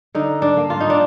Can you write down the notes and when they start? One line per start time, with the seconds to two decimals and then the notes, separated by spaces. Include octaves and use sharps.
0.15 D3 D#4
0.42 D4
0.57 A#3
0.70 F4
0.80 D#4
0.90 D4